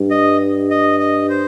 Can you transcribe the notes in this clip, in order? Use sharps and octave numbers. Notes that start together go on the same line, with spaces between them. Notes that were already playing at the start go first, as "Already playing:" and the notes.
Already playing: G2
D#5
D#5
D#5
C5